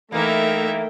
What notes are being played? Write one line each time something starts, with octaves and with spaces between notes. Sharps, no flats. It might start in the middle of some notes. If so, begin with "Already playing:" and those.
E3 A3 A#3 D#4 A#4 E5 G5